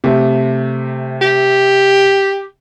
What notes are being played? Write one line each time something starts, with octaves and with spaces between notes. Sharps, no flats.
C3 A3
G4